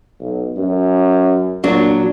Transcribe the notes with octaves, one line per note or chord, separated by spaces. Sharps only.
B1
F#2
A#2 F#3 D4